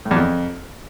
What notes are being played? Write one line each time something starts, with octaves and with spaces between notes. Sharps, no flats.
A2
E2
F2